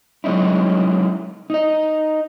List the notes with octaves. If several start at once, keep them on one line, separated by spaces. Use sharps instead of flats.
F#3 G#3 C#4 D#4 E4
D#4 D#5